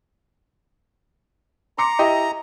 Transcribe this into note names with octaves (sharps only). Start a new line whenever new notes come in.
A#5 C6 D6 C#7
E4 G4 D#5